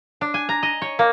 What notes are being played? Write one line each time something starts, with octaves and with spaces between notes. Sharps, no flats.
D4
G#5
A#5
D#5
C#5
A#3